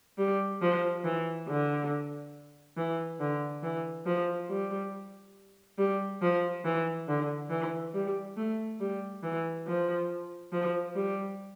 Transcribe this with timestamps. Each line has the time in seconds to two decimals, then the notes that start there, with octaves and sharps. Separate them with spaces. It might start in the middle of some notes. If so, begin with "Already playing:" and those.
0.18 G3
0.61 F3
1.04 E3
1.47 D3
2.77 E3
3.20 D3
3.63 E3
4.06 F3
4.49 G3
5.78 G3
6.21 F3
6.64 E3
7.08 D3
7.50 E3
7.94 G3
8.37 A3
8.80 G3
9.23 E3
9.66 F3
10.52 F3
10.95 G3